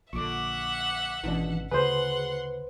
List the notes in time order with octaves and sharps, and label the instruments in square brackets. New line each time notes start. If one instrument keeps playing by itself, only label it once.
[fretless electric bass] A#1 D3 [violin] E5 F#5 [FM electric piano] C#6 D6
[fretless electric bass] G#1 B2 C#4 [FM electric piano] E3 D4
[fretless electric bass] D2 C#3 [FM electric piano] G#4 [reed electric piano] B4 C5 [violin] F#5 C6